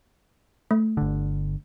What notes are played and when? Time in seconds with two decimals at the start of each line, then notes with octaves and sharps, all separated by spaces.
0.71 A3
0.97 G1 D3